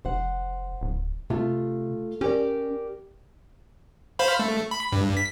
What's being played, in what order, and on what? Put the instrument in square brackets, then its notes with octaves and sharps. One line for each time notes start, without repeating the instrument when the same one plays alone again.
[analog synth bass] F1 [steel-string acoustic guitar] C5 F#5
[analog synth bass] D1
[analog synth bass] C3 [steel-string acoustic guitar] A3 F4
[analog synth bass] C#4 [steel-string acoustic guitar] G4 A#4 D5
[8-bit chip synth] C5 F5 B5
A3
B5
G2
B6